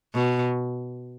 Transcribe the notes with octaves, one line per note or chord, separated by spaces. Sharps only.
B2